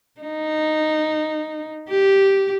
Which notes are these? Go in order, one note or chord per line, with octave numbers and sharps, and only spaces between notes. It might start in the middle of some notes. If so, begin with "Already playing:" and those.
D#4
G4